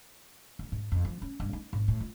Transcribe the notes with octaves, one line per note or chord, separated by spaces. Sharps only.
E2
G#2
F2
F3
C#4
G2
D#4
G#1
A2
F4